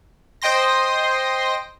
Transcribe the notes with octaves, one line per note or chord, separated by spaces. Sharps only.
C5 D#5 G5 C6 A#6